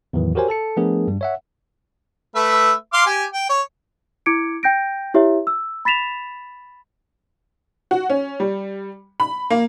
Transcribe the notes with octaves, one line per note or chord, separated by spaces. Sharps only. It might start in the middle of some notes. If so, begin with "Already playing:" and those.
E2 A2 D#3 E3 F#3
F#4 G4 A#4 C5 C#5 G#5
A4 A5 C#7
F3 A3 B3 D4 G#4 A#4
G2 G3
C#5 E5 F#5
A3 B4 E5
F5 C6 D6
G4 G#5
G5
C#5
E4 D6 G#6 C#7 D7
G5 G6 A#6 D7
E4 G4 C#5 E5
E6
B5 A6 B6 E7 F7
F#4
C#4
G3
B5
A#3